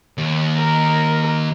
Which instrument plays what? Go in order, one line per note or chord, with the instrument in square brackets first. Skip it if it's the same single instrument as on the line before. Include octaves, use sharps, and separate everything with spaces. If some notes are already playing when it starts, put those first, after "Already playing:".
[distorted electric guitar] D#2
[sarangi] A#4